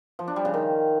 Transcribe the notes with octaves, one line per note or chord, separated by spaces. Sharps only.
F3
D4
G3
C#3
D#3